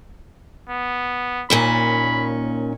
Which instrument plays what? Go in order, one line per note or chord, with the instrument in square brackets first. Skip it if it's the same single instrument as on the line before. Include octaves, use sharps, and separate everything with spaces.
[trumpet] B3
[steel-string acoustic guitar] D#2 A#2 C#4 [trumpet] B5